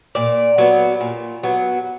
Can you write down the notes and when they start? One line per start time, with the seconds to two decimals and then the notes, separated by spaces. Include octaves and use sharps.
0.15 A#2 D5
0.58 F#3 B3
1.01 A#2
1.43 F#3 B3